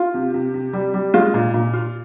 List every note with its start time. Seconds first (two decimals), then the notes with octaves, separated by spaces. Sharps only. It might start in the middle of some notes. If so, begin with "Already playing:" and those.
Already playing: F4
0.14 C3
0.34 C3
0.54 C3
0.73 G3
0.94 G3
1.14 G#3 F4
1.34 A#2
1.54 A#2
1.73 F4